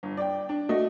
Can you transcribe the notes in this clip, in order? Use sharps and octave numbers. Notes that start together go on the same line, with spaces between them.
G1
D5 G5
D4
A3 F#4 D#5